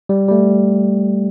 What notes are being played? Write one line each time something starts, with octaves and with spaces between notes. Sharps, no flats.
G3
G3
A3